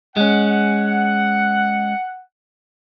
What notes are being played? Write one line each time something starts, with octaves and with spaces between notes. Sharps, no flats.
G#3 C#4 F#5